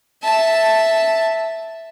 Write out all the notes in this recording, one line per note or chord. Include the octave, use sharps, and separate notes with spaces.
E5 A5